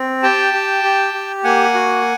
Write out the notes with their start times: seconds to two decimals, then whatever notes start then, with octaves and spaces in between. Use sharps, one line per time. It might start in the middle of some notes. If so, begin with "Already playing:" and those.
Already playing: C4
0.23 G4 G5 A5
0.54 G4
0.83 G4
1.14 G4
1.44 A#3 F#5 G#5
1.74 F#4